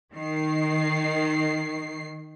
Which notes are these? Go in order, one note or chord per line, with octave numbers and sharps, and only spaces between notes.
D#3 C7